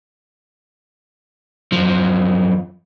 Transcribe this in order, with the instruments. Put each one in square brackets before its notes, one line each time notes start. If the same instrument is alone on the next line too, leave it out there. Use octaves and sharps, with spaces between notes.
[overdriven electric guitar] F#2 F3